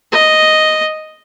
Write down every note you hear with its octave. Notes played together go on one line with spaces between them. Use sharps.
D#5